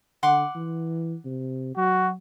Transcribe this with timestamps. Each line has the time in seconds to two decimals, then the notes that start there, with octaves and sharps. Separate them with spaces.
0.23 D3 F#5 C6 D6
0.55 E3
1.25 C3
1.77 F#3 F#4